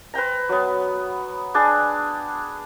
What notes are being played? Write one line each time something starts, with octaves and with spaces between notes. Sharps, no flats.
B4 C5 G5 A#5
F#3 B3
D4 G#4 G5 A5